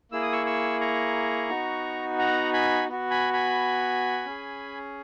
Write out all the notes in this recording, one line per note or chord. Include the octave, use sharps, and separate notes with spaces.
A#3 E4 G#4 E6
D#6
C#6 E6
C#6 E6
A#5 C#6
B3 D#4 F#4
F#5 A#5
G#5 B5
B3 F#4
G#5 B5
G#5 B5
C#4 G#4